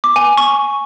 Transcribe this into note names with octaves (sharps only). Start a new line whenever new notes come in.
D6
G#5
C#6